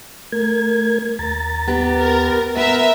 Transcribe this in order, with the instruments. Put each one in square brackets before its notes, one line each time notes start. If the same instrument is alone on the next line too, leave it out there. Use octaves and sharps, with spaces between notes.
[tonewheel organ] A3 A#4 G#6
D#2 A#5 A6
[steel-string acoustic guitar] B3 G4
[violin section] A#4
[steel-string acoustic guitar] B3 B4 [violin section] A#4 E5